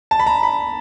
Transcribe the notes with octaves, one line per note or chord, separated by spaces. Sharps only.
A5
B5
A#5
B5